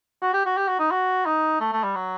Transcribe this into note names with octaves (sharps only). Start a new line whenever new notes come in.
F#4
G4
F#4
G4
F#4
D#4
F#4
D#4
A3
A3
G3
F#3